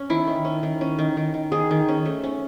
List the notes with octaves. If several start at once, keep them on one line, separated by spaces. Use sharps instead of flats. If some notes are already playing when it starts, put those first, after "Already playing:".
Already playing: C#4
D#3 E4
D#3
C#4
D#3
C#4
D#3
D#3
D#3
D#3 G#4
D#3
C#4
A3
C#4